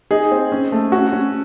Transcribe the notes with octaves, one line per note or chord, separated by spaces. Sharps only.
D#4 G#4
C4
C#4
A3
C#4 F#4
C#4